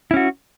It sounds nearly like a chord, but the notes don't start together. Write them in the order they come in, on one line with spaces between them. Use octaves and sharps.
E4 C#4 F#4